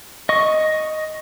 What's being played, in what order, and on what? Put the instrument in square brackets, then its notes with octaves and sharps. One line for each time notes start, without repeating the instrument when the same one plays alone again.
[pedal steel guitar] D#5 C#6